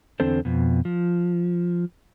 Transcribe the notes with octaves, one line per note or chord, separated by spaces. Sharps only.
E2 D3 C4 D4 A4 C5
F2 B2
F3